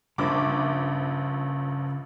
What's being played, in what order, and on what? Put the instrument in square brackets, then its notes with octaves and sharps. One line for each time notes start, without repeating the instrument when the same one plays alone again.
[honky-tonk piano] A#1 G2 D6 [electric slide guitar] C#3 E5